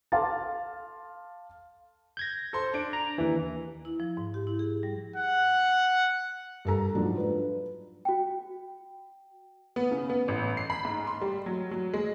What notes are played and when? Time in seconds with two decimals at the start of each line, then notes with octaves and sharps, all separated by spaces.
0.12 A4 F5 A5 C6 D6 A6
2.17 G6 G#6 A#6
2.53 A4 C5 C6
2.74 D4 D7
2.93 A#5
3.18 D#2 E3
3.85 E4
4.00 F3
4.17 G#2
4.34 G4
4.47 E4
4.59 G#4
4.83 G3
5.16 F#5
6.65 G2 A4 A#5
6.95 G#2 F3 F#3 D4
7.17 B4
8.05 F#4 G5
9.76 B3
9.91 C#3
10.10 B3
10.28 A1
10.57 C7
10.70 B5
10.85 G#2
11.07 C6
11.21 G3
11.46 F#3
11.71 F#3
11.93 G#3